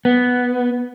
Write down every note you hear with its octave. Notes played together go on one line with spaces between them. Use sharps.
B3